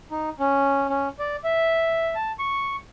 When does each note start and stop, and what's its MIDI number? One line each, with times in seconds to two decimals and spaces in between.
0.11 0.30 63
0.39 0.87 61
0.89 1.08 61
1.19 1.36 74
1.44 2.15 76
2.15 2.32 81
2.39 2.76 85